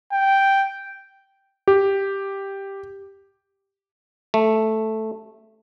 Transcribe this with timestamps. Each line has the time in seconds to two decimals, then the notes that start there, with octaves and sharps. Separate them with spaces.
0.13 G5
1.68 G4
4.34 A3